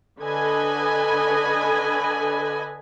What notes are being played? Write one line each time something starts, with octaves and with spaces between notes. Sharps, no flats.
D3 A4 B4 D#5 G#5 B5